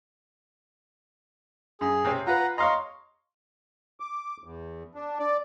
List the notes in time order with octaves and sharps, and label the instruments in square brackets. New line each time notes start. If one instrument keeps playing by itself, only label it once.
[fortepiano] F#2 [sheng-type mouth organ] G#4
[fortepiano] C3 C4 C#4
[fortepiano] F4 B4 [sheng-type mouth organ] F#5 A#5
[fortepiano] C#5 F5 A#5 [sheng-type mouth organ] D#5 C6
[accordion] D6
E2
D4
D5